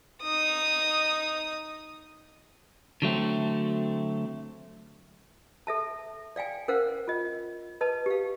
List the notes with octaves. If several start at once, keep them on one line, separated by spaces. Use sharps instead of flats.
D#4 D#6
D3 F#3 A3 C4
A4 E5 A5
D5 F5 G5 G#5
C#4 A#4 C5 F5 F#5
F4 D#5
B4 D#5 A5
G4 F5